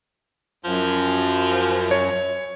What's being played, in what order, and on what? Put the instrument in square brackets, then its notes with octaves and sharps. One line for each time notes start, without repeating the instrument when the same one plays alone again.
[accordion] F#2 [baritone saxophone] F3
[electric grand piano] C#5